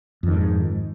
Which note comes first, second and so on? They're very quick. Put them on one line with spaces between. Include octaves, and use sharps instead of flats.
F2 D#3 G#2